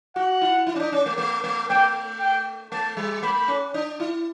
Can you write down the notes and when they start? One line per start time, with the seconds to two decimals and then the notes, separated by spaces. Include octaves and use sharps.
0.16 F#4 F#5
0.41 E4
0.67 E4
0.75 C#4
0.80 D4
0.92 C#4
1.06 A3
1.18 A3
1.44 A3
1.69 A3 G5
2.20 G5
2.72 A3 A5
2.97 G3
3.23 A3 B5
3.48 C#4
3.74 D4
4.00 E4